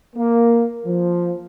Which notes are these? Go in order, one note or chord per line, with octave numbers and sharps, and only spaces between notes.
A#3
F3